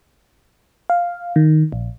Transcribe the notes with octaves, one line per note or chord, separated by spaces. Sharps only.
F5
D#3
A#1